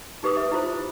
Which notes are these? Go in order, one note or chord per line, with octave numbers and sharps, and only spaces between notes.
D#4 G4 B4 D6 D#6
B4 E5
E4 F4 C5